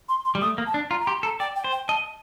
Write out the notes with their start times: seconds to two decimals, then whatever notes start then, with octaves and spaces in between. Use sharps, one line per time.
0.09 C6
0.25 C6
0.35 G3
0.41 A3 D#6
0.58 A#3
0.67 A5
0.74 D4
0.90 F4 A#5
1.01 A#5
1.07 G4 C6
1.23 A4 A#5
1.40 D5 G5
1.56 G5
1.64 C5
1.72 G5
1.88 D#5 A5